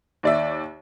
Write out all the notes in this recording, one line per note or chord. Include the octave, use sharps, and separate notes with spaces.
D#2 D5 E5